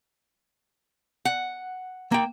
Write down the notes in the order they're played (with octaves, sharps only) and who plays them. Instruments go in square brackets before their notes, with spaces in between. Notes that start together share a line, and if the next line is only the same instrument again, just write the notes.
[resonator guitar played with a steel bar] F#5
[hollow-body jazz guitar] A#3 G5